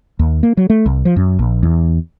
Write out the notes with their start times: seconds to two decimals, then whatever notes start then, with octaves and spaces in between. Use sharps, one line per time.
0.19 D#2
0.43 A#3
0.57 F#3
0.70 A3
0.86 C2
1.05 F3
1.16 F#2
1.39 A#1
1.63 E2